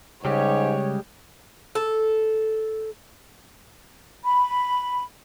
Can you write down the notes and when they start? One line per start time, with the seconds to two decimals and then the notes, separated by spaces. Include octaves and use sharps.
0.25 G#2 C#3 G3 G#3 G4 C#5
1.75 A4
4.25 B5